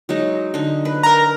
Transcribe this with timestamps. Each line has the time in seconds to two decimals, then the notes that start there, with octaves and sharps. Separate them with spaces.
0.09 F#3 G#3 D#4
0.54 D3 D#4
0.85 B4
1.03 A#4 A#5